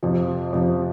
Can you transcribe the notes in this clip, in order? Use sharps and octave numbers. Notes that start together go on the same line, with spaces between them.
F2 C3 F3
F2 C3 F3